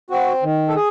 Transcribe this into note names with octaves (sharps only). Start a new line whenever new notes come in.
C4 F#4
D#3
A4
G#4